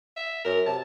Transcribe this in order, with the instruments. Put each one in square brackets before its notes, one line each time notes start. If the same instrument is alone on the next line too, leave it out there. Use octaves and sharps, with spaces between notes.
[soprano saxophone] E5
[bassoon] F#2 [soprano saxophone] A#4
[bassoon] C3 [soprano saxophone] A5